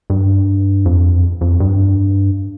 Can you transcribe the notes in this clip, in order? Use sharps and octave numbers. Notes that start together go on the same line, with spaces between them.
G2
F2
F2
G2